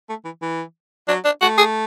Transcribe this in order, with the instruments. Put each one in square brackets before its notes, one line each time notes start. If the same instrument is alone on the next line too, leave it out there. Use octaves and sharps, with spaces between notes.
[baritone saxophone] A3
E3
E3
[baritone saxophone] F#3 [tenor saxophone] D4
[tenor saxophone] D4
[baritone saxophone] A3 [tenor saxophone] F#4
[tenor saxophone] G#4